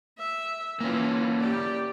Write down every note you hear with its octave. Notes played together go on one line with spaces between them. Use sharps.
E5
E3 A#3 C#4 F4
G4 D5